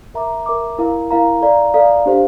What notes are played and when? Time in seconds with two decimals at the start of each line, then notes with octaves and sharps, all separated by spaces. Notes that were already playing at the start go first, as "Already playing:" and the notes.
0.14 A#4 E5 A#5 D6
0.46 A#4 E5 A#5 D6
0.78 E4 A#4 F5 A#5
1.11 E4 A#4 F5 A#5
1.41 A4 D5 F5 A#5
1.74 A4 D5 F5 A#5
2.06 D4 G4 C5 F5